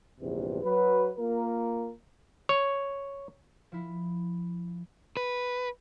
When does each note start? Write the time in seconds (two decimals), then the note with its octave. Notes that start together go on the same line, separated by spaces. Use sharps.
0.21 A#1 E2 G2 C3
0.63 F#3 B4
1.19 A#3 F4 A#4
2.49 C#5
3.72 F3 E4
5.17 B4